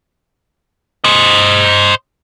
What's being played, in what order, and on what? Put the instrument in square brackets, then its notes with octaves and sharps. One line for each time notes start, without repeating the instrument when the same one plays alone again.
[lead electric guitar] C5 D#5